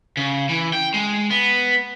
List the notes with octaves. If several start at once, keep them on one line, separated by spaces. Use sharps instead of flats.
C#3
E3
G5
G#3
B3